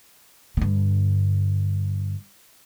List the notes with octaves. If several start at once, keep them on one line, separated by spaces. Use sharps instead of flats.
G2 D3